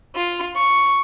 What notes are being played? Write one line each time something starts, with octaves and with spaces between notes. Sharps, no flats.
F4
C#6